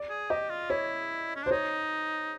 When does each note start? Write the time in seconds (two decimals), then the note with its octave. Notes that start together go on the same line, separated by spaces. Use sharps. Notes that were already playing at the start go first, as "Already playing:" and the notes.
Already playing: D5
0.10 G#4
0.30 G4 D#5
0.50 F4
0.70 E4 C#5
1.36 C#4
1.43 D4
1.46 C5
1.51 D#4 C#5